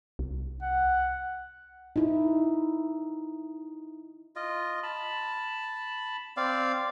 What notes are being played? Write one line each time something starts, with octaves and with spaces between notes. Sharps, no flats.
C2
F#5
D#4 E4
F4 D#5
A5 B5
C4 D5 F5